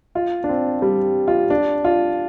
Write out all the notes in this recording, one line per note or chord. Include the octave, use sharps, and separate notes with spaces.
F4
D4
C4
G3
F4
D4
F4